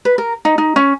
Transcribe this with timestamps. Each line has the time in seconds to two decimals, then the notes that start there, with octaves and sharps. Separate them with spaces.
0.05 B4
0.18 A#4
0.45 D#4
0.58 D#4
0.76 C#4